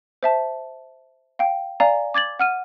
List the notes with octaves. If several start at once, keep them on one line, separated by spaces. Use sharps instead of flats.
C5 E5 A5
F5 G5
D5 F5 G#5 A#5
D6 G#6 A6 F#7
F#5 F6 D#7